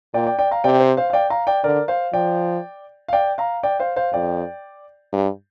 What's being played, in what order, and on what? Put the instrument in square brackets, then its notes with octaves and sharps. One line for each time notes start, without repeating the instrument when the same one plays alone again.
[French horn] A#2 [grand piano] D5 G5
[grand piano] D5 G5
D5 G5
F5 A#5
[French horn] C3 [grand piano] D5 G5
[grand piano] C5
C5 F5
F5
D5 G5
F5 A#5
D5 G5
[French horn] D3 [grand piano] A#4 D5
[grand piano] C5 F5
[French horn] F3 [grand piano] D5 G5
[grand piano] F5
D5 G5
F5 A#5
D5 G5
C5 F5
C5 F5
[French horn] F2 [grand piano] D5 G5
[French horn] G2